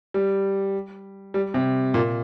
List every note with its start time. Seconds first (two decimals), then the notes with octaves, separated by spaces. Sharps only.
0.14 G3
1.34 G3
1.54 C3
1.94 A#2